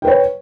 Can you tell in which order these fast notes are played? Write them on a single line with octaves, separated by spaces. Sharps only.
G5 B4 C#5